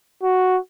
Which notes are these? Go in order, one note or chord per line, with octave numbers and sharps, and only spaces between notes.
F#4